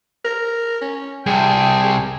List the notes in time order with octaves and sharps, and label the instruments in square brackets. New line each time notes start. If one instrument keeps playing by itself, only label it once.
[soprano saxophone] A#4
C#4
[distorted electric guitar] C2 C3 [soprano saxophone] G#4 [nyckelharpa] G5 A5